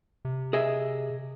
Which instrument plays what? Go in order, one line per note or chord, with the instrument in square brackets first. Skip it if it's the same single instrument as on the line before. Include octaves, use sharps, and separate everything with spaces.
[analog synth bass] C3
[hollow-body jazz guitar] G#4 D#5 E5